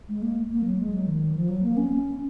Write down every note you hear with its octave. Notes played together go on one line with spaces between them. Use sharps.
G#3
A#3
A#3
F#3
G#3
F#3
D#3
F3
F#3
A#3
C#4